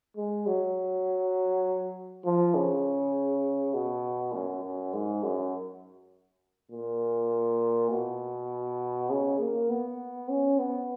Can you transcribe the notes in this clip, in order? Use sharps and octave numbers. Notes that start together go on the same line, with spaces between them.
G#3
F#3
F3
C#3
B2
F#2
F#2
G#2
F#2
A#2
B2
C#3
A#3
B3
C#4
B3